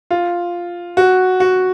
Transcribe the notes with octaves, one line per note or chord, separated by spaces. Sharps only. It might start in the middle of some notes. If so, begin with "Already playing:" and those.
F4
F#4
F#4